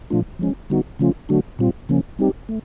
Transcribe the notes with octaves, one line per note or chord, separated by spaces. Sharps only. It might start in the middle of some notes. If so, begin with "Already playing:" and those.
A#2 F3 A3 D4 F4
F3 G#3 C#4
D3 G3 B3 D#4 F#4
C#3 F3 A3 C#4 F4
D3 F#3 A3 D4 F#4
A#2 G3 C4 F4
C#3 F3 A#3 C#4
G3 C4 D#4 G4
A3